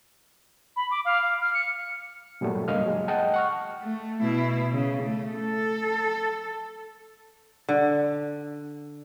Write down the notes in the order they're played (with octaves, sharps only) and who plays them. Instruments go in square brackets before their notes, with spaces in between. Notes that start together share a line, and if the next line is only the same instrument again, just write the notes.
[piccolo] B5
D6
F5
F5
F6
C#7
[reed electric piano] G2 A#2 F#3 G3 A3
C#2 G2 A#3 D#5 F5 F6
F#3 G#3
D#5 F#5 G5 A5
F#5 C#6 F6
[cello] A3
B2 E4
C#3
A3
A4
[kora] D3